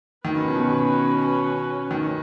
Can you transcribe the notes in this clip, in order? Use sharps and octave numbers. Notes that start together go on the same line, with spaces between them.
D#3 C#4 F#4 B4
B2
D#3